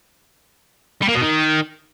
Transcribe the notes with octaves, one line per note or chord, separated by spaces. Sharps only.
G3
A#3
B2
D#3